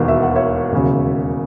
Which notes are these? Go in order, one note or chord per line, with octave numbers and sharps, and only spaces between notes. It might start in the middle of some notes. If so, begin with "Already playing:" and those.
Already playing: E1 D#2 D#3 F#3
E5
F#5
C#5 E5
E1 D#2 C#3 F#3